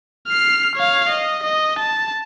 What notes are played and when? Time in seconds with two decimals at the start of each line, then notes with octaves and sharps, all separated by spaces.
0.28 F6 C7
0.75 C#5 F5
1.09 D#5
1.43 D#5
1.79 A5